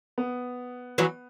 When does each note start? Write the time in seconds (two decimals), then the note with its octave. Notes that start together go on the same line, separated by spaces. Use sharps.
0.18 B3
0.98 E3 F#3